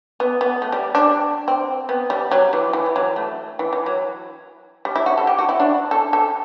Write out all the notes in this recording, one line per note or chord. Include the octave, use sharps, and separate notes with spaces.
B3
B3
A3
G3
D4
C4
B3
G3
F#3
E3
E3
G3
F#3
A3
E3
E3
F#3
G3
E4
F#4
A4
G4
F#4
E4
D4
A4
A4